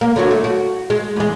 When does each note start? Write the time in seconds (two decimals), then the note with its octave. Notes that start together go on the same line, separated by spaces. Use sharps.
0.01 A#3
0.16 D3 F#3 F#4
0.31 A3
0.44 F#4
0.90 G#3
1.16 E2 G#3